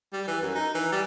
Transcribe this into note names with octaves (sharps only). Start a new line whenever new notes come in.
G3
E3
F#2
D#4
E3
G3